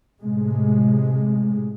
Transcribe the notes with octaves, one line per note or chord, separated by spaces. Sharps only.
A2 C3 G#3